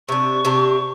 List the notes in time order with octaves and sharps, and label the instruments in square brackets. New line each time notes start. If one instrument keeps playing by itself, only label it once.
[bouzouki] C3 D4 [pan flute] C#6
[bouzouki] C3 D4 G4